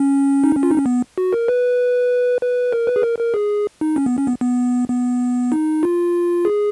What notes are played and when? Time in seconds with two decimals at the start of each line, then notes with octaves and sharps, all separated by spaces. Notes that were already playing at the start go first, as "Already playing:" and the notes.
Already playing: C#4
0.44 D#4
0.55 C#4
0.63 F4
0.71 D#4
0.78 C#4
0.86 B3
1.18 F#4
1.33 A#4
1.48 B4
2.41 B4
2.73 A#4
2.87 B4
2.96 G#4
3.03 A#4
3.19 A#4
3.34 G#4
3.81 D#4
3.96 C#4
4.06 B3
4.18 C#4
4.27 B3
4.41 B3
4.89 B3
5.52 D#4
5.83 F4
6.45 G#4